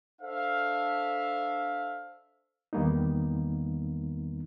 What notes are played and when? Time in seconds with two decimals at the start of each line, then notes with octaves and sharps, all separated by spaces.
0.22 D4 A4 C5 E5 F5
2.73 E2 D#3 G3 A#3 B3 D#4